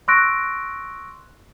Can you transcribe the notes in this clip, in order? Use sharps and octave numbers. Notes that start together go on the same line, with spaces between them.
C6 C#6 E6 F#6 A#6 D7